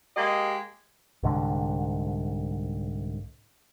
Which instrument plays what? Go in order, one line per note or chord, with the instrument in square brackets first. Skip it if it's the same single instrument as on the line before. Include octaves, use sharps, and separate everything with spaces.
[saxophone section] G#3 A#3 G4 D#5
[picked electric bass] C2 G#2 D3